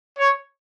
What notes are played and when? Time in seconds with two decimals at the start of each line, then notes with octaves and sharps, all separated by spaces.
0.18 C#5